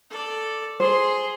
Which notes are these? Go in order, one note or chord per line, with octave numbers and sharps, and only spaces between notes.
A4 D5
G#4 C5 C6